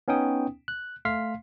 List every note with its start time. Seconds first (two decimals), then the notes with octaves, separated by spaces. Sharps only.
0.08 B3 C#4 D#4 G5 D#6
0.68 F#6
1.05 A3 F5 C6 F6 B6 C7